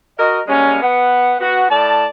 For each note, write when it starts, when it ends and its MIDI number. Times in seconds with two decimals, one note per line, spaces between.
0.18 0.39 66
0.18 0.39 70
0.18 0.39 75
0.46 0.80 55
0.46 0.80 56
0.46 0.80 58
0.46 0.80 61
0.81 1.34 59
0.81 1.34 78
1.39 1.65 59
1.39 1.65 66
1.69 2.07 45
1.69 2.07 74
1.69 2.07 81